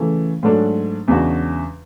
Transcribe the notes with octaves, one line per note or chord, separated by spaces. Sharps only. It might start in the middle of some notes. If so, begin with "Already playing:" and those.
Already playing: C#3 E3 A3
G#2 F#3 A3 D4 A4
E2 C#3 G#3 D4 F#4